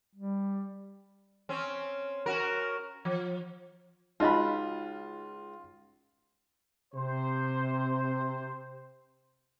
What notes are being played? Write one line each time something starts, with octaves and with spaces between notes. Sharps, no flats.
G3
C4 C#4
C#4 F#4 A#4
F3
C#2 D#4 F4 F#4 D#5 B5 C6
C3 C5